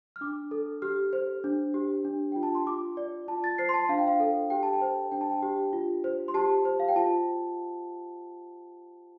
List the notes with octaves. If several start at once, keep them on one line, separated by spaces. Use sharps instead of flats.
F6
D4 D6
A4
G4 F6
C5
D4
G4
D4
F4 G5
A5
C6
F4 D6
D5
F4 A5
A6
C5 C7
C6
A5
D4 F5
G5
F5
A4
G4 G5
A5
G5
C5
D4 G5
A5
G5
G4
F4
C5
C6
G4 A5
C5
F5
G5
F4 A5